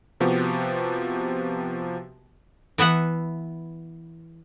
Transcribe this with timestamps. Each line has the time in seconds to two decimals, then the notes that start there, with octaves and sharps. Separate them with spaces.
0.20 C3 F3 B3 F#4 G4
2.78 E3 B3 E5 F#5